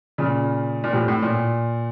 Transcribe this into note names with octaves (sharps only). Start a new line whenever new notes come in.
A#2 C#3
A#2
A2 C3
A2
A#2